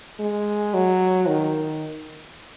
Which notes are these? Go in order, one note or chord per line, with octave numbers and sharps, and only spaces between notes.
G#3
F#3
D#3